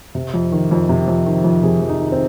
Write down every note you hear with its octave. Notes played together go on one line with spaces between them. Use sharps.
C3
F2
D#3
F2
C3
F2
D#3
F2
C3 G#4
F2
D#4
D#3
C4